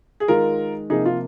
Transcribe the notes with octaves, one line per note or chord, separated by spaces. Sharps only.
G#4
D#3 G#3 F4 A#4
C3 F3 A#3 D#4 G#4
F4